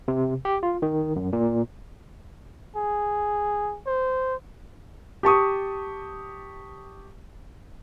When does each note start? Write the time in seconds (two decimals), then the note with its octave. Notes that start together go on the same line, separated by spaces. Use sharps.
0.08 C3
0.45 G4
0.63 F4
0.82 D#3
1.16 F#2
1.33 A#2
2.76 G#4
3.87 C5
5.23 G4 A5 C#6 D#6